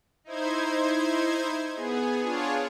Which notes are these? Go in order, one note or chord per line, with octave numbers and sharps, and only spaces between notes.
D#4 E4 C5 G#6
B3 G#4
D4 F4 G#4 C#5